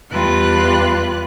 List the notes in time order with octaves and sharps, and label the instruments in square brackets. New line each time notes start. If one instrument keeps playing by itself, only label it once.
[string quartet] E2 G3 F4 G4 B4 F#6